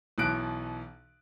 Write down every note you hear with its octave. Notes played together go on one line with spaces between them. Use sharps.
B1 B2 E3 F#6 D7